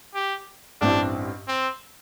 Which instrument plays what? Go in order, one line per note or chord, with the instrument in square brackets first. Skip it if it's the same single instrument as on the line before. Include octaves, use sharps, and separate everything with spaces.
[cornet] G4
[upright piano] A1 G2 G3 C4 E4 [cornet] D4
[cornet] C4